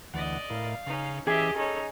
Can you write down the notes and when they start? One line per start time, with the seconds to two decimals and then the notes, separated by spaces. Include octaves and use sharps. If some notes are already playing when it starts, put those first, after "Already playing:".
0.14 D2 E3 D5 D#5 F#5
0.50 A2 E4 A#4 F5
0.86 C#3 C#4 D#4
1.27 E3 C#4 G4 G#4 D#5 E5 D6
1.56 C#4 D#4 A4 C#5